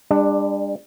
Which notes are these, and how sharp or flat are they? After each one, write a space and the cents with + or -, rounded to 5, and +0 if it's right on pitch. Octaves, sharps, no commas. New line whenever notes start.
G3 +40 D4 +10